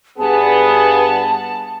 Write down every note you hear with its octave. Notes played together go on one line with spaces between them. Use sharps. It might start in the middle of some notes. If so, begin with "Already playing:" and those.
G2 B3 G#4 A5